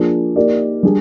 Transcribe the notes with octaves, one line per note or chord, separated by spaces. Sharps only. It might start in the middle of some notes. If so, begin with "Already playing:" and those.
Already playing: F3 A#3 D4 F4 G#4
A#3 D#4 G4 A#4 D5
G3 D4 G#4